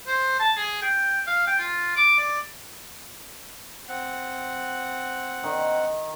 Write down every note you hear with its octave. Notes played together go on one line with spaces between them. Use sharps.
C5
A5
G#4
G5
F5
G5
F4
D6
D5
C4 F#5
D#3